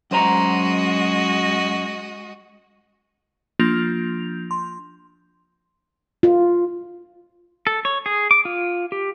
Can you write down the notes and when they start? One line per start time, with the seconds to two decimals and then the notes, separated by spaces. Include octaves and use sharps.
0.11 F#2 G#3 F#4 C5 D#5 A#5
3.59 F3 A#3 D4 F4 G6 F7
4.51 C6
6.23 F4
7.67 A4
7.85 C#5
8.06 G#4
8.31 D6
8.45 F4
8.92 G4